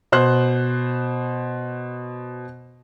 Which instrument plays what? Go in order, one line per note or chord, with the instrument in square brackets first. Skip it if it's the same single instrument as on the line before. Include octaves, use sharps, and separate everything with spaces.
[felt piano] B2 C5 F#6